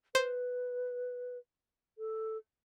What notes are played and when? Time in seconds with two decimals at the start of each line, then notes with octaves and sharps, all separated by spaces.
0.15 B4 C5
1.98 A4